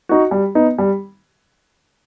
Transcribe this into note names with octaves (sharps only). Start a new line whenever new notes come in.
D#4 F#4
G3
B3 D#4
G3